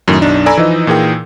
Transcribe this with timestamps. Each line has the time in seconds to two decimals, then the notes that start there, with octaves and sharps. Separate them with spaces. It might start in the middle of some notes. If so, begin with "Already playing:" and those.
0.08 F#2 A2 D#3
0.21 B1 F#2 D4 D#4
0.46 A4 D5 G#5 A#5 B5 E6
0.57 E3 F3 D#4 D#5
0.87 A#2 E3 D#4 G#4 A#4 G5